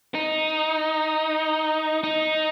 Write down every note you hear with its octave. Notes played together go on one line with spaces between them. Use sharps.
D#4
D#4